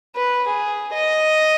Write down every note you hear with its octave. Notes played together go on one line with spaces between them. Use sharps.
B4
G#4
D#5